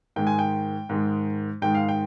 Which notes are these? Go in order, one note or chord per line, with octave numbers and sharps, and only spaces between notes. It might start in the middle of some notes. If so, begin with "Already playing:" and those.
G#2 D#3 G#3 G5
G#5
G5
G#2 D#3 G#3
G#2 D#3 G#3 G5
F5
G5